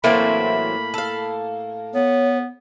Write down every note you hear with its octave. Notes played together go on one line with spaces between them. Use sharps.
A2 E3 F#3 A3 A#3 C4 B5
A4 F5
B3 C#5